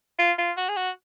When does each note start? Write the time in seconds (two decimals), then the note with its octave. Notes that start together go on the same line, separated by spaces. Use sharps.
0.19 F4
0.38 F4
0.57 F#4
0.69 G#4
0.76 F#4